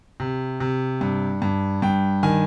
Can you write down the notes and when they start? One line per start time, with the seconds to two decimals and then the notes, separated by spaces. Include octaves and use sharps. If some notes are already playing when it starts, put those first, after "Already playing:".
0.20 C3
0.60 C3
1.01 G2
1.42 G2
1.82 G2 G5
2.23 D#3 G#5